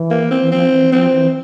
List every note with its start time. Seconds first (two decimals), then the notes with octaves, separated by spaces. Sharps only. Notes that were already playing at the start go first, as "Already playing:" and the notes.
Already playing: E3
0.10 A#3
0.31 C4
0.42 E3
0.51 F3 C4
0.72 E3
0.92 F3 C4
1.13 E3